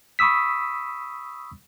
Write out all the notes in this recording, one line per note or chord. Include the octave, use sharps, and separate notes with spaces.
B5 C#6 D#6 E6 B6